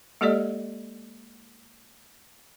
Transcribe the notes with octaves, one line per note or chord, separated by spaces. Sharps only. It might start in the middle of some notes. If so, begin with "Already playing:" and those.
G#3 A#3 G4 A4 D5 D#5